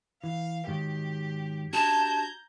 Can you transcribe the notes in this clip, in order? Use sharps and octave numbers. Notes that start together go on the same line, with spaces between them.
E3 F5
G#2 D#3 F#3 G4
D4 F#4 G4 A5 A#5 G6 G#6